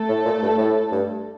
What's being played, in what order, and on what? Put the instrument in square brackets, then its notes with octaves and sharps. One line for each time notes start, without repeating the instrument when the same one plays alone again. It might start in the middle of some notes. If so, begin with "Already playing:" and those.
Already playing: [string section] A3 A4
[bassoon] A2
A#2
G2
A2
G2